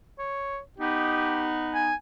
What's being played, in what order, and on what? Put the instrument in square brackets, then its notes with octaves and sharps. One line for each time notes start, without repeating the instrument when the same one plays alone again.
[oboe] C#5
[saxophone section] B3 D#4 [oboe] G4
[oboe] G#5